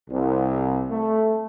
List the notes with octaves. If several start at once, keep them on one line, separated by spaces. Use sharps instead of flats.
C2
A3